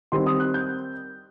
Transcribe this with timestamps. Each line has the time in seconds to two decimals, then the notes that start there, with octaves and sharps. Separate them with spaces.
0.12 D#3 G3 C4 C6
0.26 D#6
0.40 F#6
0.54 G6